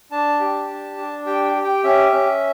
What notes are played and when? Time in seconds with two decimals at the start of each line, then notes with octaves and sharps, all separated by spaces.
0.11 D4 A5
0.40 G4
0.68 D4
0.97 D4
1.26 G4 G5
1.45 G5
1.55 G4
1.64 G5
1.84 C#4 E5
2.12 C#4